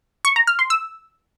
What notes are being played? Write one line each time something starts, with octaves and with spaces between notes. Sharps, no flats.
C#6
A#5
F6
C6
E6